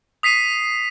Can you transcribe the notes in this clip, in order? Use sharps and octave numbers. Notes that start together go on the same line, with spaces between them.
D#6 B6 C7 D#7